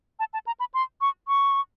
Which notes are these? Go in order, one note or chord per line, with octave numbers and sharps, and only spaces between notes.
A5
A5
A#5
B5
C6
C#6
C#6